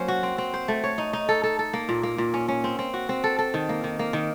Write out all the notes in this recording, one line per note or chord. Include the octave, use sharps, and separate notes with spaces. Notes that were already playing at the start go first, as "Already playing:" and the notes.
Already playing: F#3 A#3 C#4 C5
F#4
C4
C4
C5
A3
C#5
D#4
D#4
A4
A4
A4
A#3
A#2
A#3
A#2
C#4
C#4
C4
C4
F#4
C4
A4
A4
D#3
A#3
D#3
A#3
D#3